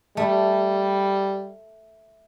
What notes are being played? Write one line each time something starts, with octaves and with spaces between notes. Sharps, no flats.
G3 A3